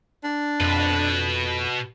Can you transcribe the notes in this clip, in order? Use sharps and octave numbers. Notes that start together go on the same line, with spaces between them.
D4
F2 B2 B4